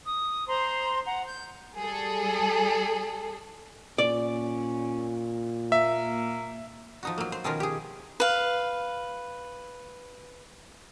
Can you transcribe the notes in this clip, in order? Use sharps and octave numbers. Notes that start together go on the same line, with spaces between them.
D#6
C5 A#5 C6
F#5 A#5
G6
G3 G#4 A4
A#2 C#4 D5
A#3 E5
F3 D#4 F#4
F#3 A#3
C5
B2 D#3 F3 C#4 F4 A#4
G4 G#4
B4 F5